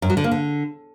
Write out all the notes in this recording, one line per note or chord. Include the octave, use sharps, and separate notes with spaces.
F#2
F#3
D3
A#3
D3